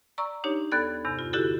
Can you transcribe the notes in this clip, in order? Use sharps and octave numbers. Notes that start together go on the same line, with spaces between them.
D5 A#5 C#6 E6
D4 D#4 G4 C#5
D#2 B3 A4 D5 G#6 A6
E2 G2 C3
F4
D3 E4 F#4 G4 A4